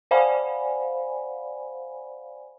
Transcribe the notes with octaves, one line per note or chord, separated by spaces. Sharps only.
C5 D5 F5 F#5 G#5 B5